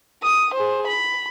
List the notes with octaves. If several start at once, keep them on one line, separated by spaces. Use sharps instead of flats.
D#6
G#4 C5
B5